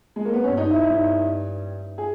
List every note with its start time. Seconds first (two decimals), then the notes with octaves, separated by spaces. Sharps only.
0.16 G#3
0.25 A#3
0.34 B3
0.44 G2 C#4
0.57 D#4
0.71 E4
0.84 G2 D#4
1.98 G#4